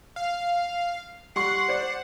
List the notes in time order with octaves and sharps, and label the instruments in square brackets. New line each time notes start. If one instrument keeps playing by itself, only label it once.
[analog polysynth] F5
[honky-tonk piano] G3 C6 C#6 [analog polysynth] F#5 [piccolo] C7
[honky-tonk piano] C5 D5